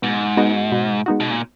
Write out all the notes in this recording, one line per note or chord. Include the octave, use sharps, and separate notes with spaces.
G#2 B2
G#3 B3 D#4 F#4
B2
G#3 B3 D#4 F#4
B2
A#2